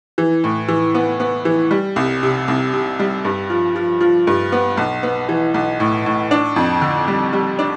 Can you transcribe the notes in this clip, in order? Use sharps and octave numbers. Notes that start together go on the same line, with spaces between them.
E3
A2
E3
B3
B3
E3
G3
C2
C3
C2
C3
G3
G2
F3
F3
F3
G2
B3
B1
B3
E3
B1
A2
A2
D4
F2
D3
G3
G3
D4